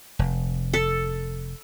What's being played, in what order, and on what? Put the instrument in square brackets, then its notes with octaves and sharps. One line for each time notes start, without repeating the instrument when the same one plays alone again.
[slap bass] F1
[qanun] A4